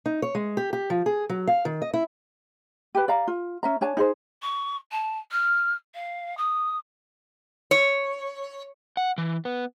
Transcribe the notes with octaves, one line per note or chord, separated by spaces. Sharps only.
D#4
C#5
G#3
G4
G4
F3
G#4
F#3
F5
D#3
D#5
E4
G4 B4
D5 F5 A#5
F4
C#4 E5 A#5
D4 C#5 G#5 A5
D#4 G#4 C5
C#6
A5
F6
F5
D#6
C#5
F#5
E3
B3